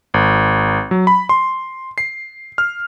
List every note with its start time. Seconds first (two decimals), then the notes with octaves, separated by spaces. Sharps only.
0.14 G#1
0.91 F#3
1.07 B5
1.29 C6
1.98 C7
2.58 F6